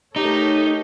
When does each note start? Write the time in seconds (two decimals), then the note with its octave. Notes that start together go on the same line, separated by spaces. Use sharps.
0.16 A3 D#4 G4 A4 A#4 C#5